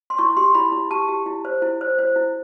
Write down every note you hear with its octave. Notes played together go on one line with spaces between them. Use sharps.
C6
E4 C#6
G4 C6
E4 B5
E4
G4 A5
G4
E4
C5
E4
C5
C5
E4